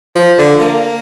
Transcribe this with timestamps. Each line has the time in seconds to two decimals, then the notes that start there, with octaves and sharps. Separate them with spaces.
0.15 F3
0.38 D3
0.61 A#3